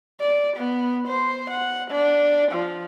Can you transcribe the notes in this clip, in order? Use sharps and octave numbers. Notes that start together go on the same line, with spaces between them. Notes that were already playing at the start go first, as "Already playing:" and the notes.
D5
B3
C5
F#5
D4
F3